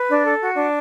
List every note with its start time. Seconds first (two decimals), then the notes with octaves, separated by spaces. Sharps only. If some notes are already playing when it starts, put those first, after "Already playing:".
Already playing: B4
0.09 D4
0.24 A4
0.41 F#4
0.56 D4